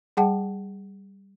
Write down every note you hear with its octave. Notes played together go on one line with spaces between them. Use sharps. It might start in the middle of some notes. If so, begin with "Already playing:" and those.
G3 G#4 F#5 G5 A5